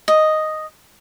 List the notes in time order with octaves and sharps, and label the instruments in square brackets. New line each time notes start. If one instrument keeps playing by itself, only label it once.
[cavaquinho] D#5